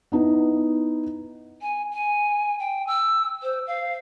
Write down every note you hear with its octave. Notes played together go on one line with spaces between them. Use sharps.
B3 D#4 E4
G#5
G#5
G5
E6
C5
F5